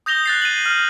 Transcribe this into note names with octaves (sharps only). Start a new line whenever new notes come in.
D#6 G6 A#6 F7 G7
F#6 A6 C7
D#7 F#7
F6